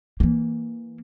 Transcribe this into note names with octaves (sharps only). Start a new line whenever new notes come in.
E3 A#3